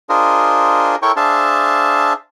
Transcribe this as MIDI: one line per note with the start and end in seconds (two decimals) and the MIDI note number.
0.09 0.96 62
0.09 0.96 65
0.09 0.96 68
0.09 0.96 70
0.09 0.96 72
0.09 0.96 75
1.02 1.12 64
1.02 1.12 69
1.02 1.12 70
1.02 1.12 73
1.02 1.12 79
1.02 1.12 85
1.16 2.13 62
1.16 2.13 68
1.16 2.13 72
1.16 2.13 76
1.16 2.13 77
1.16 2.13 81